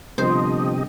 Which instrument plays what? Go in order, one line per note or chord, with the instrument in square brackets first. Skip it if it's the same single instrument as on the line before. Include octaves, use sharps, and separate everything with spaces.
[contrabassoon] G1 [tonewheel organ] C3 G4 D#5 [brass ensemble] F3 [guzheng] C5